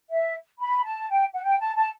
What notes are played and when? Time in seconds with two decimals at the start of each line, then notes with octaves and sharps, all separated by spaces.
0.10 E5
0.60 B5
0.84 A5
1.09 G5
1.34 F#5
1.43 G5
1.59 A5
1.75 A5